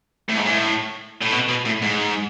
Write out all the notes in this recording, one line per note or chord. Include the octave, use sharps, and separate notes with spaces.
A2
G#2
A2
A2
B2
B2
A2
G#2